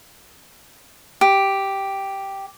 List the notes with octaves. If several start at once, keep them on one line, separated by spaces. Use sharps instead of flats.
G4